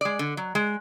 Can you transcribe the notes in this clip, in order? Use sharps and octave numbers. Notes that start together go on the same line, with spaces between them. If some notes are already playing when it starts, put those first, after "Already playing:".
G#3 D5
D3
F#3
G#3